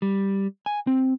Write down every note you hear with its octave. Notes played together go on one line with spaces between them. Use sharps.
G3
G#5
C4